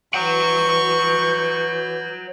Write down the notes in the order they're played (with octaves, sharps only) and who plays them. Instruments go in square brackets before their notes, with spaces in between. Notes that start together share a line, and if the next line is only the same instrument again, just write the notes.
[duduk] E3 [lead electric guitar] C#5 F#5 [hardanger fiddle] C#6 [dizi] G6